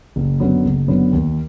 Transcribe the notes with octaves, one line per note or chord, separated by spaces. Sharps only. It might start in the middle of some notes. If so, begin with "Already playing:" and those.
F#1
F#2 D3 F#3 B3
F#1
F#2 D3 F#3 B3
D#2